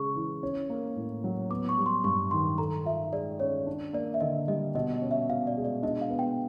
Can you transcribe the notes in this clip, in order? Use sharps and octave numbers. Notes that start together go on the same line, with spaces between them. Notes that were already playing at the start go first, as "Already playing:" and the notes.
Already playing: C#3 G#3 C#6
E3
C#4
A#3
A2
F#3
B3 D6
C#6
G3
C6
G2 C#6
D#3 C6
A4 A#5
F4 E5
G#3 D5
C#4 C#5
D4
A#3 D5
E5
D3 D#5
G3 D#5
B2 D#5
D#5
C#4
E5
B2 F5
D5
G#3
D5
D4 D#5
F5
B3
G5